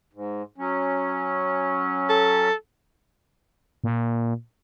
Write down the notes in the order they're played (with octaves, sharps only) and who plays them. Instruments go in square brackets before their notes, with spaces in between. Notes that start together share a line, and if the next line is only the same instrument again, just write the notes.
[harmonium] G#2
F#3 C#4
[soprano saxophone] A4
[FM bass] A#2